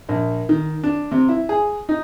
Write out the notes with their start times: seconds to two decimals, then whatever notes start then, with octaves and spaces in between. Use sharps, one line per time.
0.09 A#1
0.49 D#3
0.84 D4
1.11 C3
1.29 E4
1.49 G#4
1.89 D#4